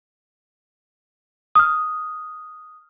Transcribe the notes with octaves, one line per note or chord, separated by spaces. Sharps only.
D#6 F6